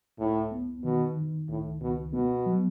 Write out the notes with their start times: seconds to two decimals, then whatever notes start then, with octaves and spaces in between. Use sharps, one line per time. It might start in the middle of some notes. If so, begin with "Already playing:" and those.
0.19 C#2 A2
0.52 B3
0.83 B2 D#3
1.17 D#3
1.49 C#2 A2
1.81 C#2 B2
2.13 B2 B3
2.46 F#3